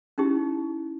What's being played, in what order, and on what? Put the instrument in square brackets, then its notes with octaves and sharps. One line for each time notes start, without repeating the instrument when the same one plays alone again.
[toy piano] C#4 D#4 E4 G4